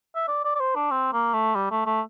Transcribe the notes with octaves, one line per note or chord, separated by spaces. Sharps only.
E5
D5
D5
D5
C5
D4
C4
A#3
A3
G3
A3
A3